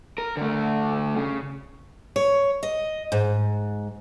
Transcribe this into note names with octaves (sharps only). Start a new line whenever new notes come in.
A#4
D3 A3
C#3
C#5
D#5
G#2